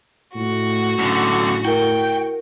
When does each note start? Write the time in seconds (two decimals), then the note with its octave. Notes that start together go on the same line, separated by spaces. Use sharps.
0.35 A2 F#4
0.99 F#2 A2 D3
1.65 E4 A#4 G5